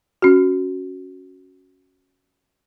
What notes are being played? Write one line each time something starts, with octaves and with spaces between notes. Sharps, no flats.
C#4 F#4